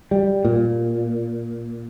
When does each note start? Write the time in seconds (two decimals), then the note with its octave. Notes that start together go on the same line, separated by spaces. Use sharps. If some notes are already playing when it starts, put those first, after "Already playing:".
0.11 G3
0.45 A#2